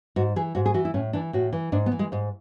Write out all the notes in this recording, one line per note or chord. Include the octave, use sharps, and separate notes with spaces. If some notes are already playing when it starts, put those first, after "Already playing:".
G#2 F#4
E3 G#4
G#2 F#4
G#4
E3 F#4
E4
A2 C#4
E3 D4
A2 F#4
E3
G#2 D4
B3
E3
G#3
G#2 G#3